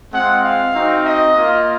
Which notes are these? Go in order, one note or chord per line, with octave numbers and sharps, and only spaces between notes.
G#3 C4 F4 F#5
F5
C4 D#4 F#4
D#5
A#3 F4